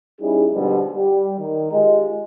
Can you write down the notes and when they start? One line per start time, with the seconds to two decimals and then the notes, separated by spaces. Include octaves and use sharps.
0.21 G3 C#4 D#4 E4 G#4
0.53 G#2 B2 D3 F3 G3
0.92 G3
1.39 D#3
1.72 G#3 F4 G4 D#5